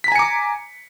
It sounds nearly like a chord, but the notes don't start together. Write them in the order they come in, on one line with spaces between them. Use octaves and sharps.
B6 A#5 G#5 C#7 D6